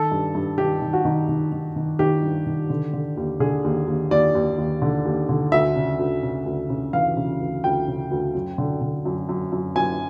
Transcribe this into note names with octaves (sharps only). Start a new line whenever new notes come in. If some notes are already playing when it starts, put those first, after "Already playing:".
Already playing: D#3 A4
G2
G2
D#3 G4
D#3
F#4
D#3
D#3
D#3
D#3
D#3 G4
G2
D#3
D3
D3
D#2
D3 G#4
D#2
D#2
D#2 D5
D#2
D#2
D3
D#2
D3
D2 E5
C#3
D2
C#3
D2
C#3
E3 F5
C#3
D2
D2 G5
C#3
D2
F#2
D3
D3
F#2
F#2
F#2
F#2 G#5